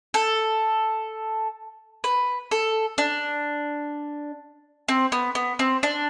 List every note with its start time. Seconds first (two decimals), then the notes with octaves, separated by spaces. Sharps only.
0.14 A4
2.04 B4
2.51 A4
2.98 D4
4.88 C4
5.12 B3
5.35 B3
5.59 C4
5.83 D4